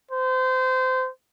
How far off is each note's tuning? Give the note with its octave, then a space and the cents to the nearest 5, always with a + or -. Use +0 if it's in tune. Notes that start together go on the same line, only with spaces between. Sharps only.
C5 -25